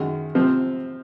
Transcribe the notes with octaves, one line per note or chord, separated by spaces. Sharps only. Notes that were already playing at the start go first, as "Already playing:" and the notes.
Already playing: F#2 D#3 G#3
C3 F3 C4